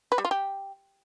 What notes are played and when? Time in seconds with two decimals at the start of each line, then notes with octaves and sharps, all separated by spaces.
0.12 B4
0.18 G3
0.25 F4
0.31 G4